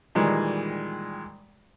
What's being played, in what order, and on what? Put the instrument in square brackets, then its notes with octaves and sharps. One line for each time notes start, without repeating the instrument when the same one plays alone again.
[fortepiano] A#2 D#3 E3 G3 G#3